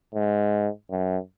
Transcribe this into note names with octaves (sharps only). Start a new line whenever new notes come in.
G#2
F#2